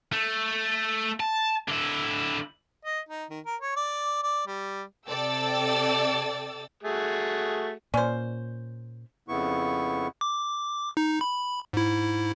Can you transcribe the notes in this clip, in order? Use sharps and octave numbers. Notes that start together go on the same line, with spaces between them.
A3
A5
D3 E4
D#5
D#4
D#3
A#4
C#5
D5
D5
G3
C3 A4 D5 G5 E6 A6
A3 F#4 G#4
A#2 C#4 C5 D5
F2 C#3 B3 E4 C#6
D6
D#4
B5
G#2 E4